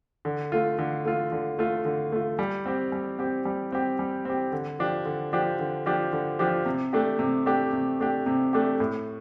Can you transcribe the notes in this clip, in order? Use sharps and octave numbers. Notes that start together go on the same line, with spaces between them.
D3
A3 F4
D3
A3 F4
D3
A3 F4
D3
A3 F4
G3
C4 G4
G3
C4 G4
G3
C4 G4
G3
C4 G4
D3
F3 D4 G4
D3
F3 D4 G4
D3
F3 D4 G4
D3
F3 D4 G4
C3
A3 D4 G4
C3
A3 D4 G4
C3
A3 D4 G4
C3
A3 D4 G4
A2